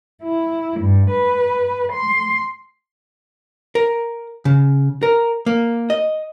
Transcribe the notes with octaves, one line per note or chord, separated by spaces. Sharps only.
E4
G2
B4
C6
A#4
C#3
A#4
A#3
D#5